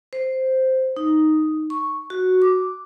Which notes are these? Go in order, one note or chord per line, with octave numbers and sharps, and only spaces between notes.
C5
D#4
C#6
F#4
D6